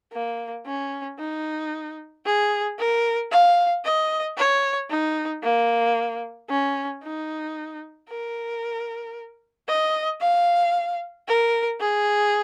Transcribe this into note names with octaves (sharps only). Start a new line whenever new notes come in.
A#3
C#4
D#4
G#4
A#4
F5
D#5
C#5
D#4
A#3
C#4
D#4
A#4
D#5
F5
A#4
G#4